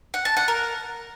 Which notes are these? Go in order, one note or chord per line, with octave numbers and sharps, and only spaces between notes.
F#5
A5
F#5
A#4